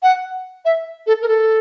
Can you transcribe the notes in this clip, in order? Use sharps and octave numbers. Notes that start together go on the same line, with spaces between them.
F#5
E5
A4
A#4
A4